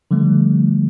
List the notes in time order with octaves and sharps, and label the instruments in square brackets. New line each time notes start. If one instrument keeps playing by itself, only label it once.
[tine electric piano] D3 F3 G3 A3